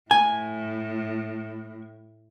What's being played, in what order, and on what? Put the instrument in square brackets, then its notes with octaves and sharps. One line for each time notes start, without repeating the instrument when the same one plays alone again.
[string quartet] A2 [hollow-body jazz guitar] G#5